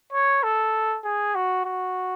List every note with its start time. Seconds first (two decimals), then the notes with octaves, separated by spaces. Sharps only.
0.13 C#5
0.43 A4
1.04 G#4
1.35 F#4
1.65 F#4